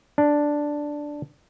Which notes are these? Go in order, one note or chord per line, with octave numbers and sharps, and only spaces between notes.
D4